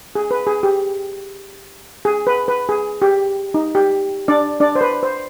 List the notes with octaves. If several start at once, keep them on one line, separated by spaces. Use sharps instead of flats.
G#4
B4
G#4
G4
G#4
B4
B4
G#4
G4
D#4
G4
D4 D5
D4 D5
C5
B4
C5